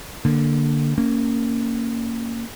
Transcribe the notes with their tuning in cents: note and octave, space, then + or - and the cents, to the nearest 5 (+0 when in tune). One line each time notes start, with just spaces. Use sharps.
D3 +0 A#3 +0
A#3 -20 C#4 +0